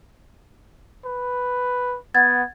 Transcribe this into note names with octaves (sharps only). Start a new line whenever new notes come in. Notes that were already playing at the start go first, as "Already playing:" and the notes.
B4
B3 F#5 G#6 A6